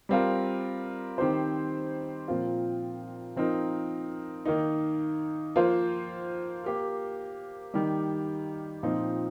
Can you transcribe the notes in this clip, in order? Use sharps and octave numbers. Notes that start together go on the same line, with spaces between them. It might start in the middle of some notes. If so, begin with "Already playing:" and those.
G3 C4 F4 A#4
D#3 C4 G4 C5
A#2 F3 C4 F4 A#4
F3 C4 D#4 A#4
D#3 A#3 D#4
F3 A#3 F4 C5
A#3 G4 A#4
D#3 G3 A#3 G4
A#2 F3 C4 D#4